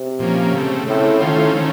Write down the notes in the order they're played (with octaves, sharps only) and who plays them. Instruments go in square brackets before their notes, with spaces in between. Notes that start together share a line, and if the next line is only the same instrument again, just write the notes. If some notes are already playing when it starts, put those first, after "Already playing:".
Already playing: [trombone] C3
[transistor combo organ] A#2 F3 A#3 C#4
C#3 A3 C4
[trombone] A2 [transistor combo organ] C#3 A3 C4
[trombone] A2 [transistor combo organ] D#3 A3 C#4 F4 C5
[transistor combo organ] D#3 A3 C#4